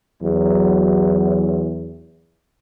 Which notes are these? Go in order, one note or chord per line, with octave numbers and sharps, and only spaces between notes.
E2 F#3